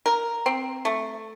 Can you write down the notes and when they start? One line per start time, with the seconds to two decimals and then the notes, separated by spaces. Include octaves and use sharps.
0.06 A#4
0.46 C4
0.85 A3